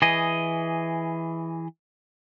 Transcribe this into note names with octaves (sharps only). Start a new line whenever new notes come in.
E3 G#4 D#5